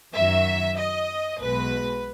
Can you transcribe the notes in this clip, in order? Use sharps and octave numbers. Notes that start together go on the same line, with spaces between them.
F#2 D#3 F#3 E5
D#5
B1 B2 G#3 B4